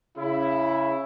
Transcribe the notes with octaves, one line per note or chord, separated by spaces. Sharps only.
C#3 E4